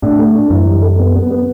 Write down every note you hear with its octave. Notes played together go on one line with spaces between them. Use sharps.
A2 D4
A3
D4
F#2 E3
G3
A4
B3
B3
B3